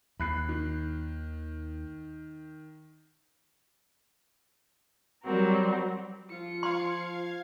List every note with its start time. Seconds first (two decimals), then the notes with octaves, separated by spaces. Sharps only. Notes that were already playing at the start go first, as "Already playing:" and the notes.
0.20 D#2 B5 F#6 C7
0.49 D#3
5.24 F#3 G3 C4 F#4 A#4
6.30 F3 F4 C#7
6.63 F5 C6 G#6